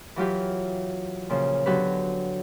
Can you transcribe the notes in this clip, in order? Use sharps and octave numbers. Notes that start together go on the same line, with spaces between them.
E3 F#3 F4 G4
A#2 C#3 F3
D3 F#3 B3 G4 B4